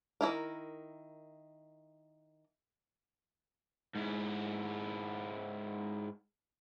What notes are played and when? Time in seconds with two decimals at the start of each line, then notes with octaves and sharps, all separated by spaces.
0.21 D#3 A#3 E4 A#4
3.96 G#2 E4